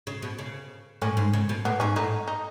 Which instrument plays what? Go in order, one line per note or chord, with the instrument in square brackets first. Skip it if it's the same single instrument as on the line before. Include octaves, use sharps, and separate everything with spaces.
[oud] C#3
B2
C#3
[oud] A2 [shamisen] C#4
[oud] G#2
C#3
B2
[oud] A2 [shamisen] B3
[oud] G#2 [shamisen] C#4
[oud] A2 [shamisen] D#4
[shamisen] D#4